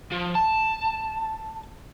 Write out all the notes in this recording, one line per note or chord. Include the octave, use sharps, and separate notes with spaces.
F3
A5